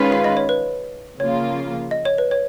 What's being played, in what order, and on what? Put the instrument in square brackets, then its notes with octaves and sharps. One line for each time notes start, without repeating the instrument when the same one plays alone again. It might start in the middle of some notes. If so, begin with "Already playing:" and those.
Already playing: [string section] D#3 G#3 C#4 F4 B4
[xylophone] F5
D#5
C#5
B4
[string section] C#3 F3 A#3 F4 [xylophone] C#5
[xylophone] D#5
C#5
B4
C#5